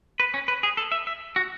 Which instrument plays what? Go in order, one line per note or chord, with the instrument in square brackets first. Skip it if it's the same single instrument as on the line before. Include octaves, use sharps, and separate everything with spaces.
[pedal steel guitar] B4
C#4
B4
G#4
A4
E5
E5
F#4